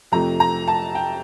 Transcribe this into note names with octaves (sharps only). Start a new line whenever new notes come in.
F2 C3 F3 A3 A#5
A#5
A5
G5